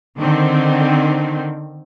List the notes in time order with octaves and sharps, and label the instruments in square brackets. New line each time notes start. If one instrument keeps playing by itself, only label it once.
[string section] D3 D#3 C4